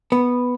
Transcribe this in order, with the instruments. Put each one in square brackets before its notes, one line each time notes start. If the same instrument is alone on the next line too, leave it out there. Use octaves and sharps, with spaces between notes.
[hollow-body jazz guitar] B3